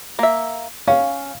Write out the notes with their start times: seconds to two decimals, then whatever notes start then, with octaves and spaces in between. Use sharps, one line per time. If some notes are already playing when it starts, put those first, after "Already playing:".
0.19 A#3 E5
0.88 C#4 F5